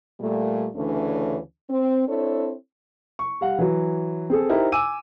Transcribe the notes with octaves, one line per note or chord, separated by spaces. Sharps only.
A#2 G3 A3
D2 C#3 E3 A3 C#4 D4
C4
C4 D4 E4 A4 C#5
C#6
G3 F5 F#5
E3 F#3
C4 G#4 A4
D#4 E4 G4 A#4 C5
G#5 D6 E6 D#7